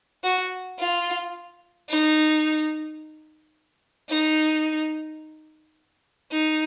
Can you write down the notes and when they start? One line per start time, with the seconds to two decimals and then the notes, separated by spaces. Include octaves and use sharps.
0.24 F#4
0.79 F4
1.90 D#4
4.09 D#4
6.32 D#4